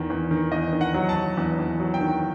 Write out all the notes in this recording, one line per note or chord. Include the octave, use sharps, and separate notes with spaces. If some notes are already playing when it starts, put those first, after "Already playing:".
Already playing: E2 D#3
E2
D#3
E2 D#5
D#3
F#5
F#3
A5
F#3
E2
E2
F#3
G5
D#3